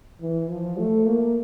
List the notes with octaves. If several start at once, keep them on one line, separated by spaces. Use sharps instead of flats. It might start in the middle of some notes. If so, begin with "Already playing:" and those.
E3
F3
A3
A#3